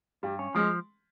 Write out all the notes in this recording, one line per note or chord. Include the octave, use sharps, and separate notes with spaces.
G2 G3
C#4
F3 G#3